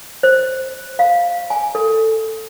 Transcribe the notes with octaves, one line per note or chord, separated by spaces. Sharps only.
C5
F5
G#5
A4